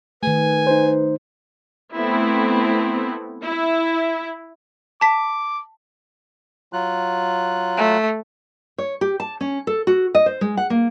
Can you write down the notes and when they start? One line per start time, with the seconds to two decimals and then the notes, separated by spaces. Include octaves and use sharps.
0.23 D#3 A3 B4 G#5
0.67 D#4 C5
1.94 A3 B3 C4 E4
3.43 E4
5.01 A5 D6 B6
6.73 F#3 F4 F#6
7.77 A3
8.78 C#5
9.01 G4
9.20 A5
9.41 C#4
9.67 A4
9.87 F#4
10.15 D#5
10.26 C5
10.41 G#3
10.57 F#5
10.70 A#3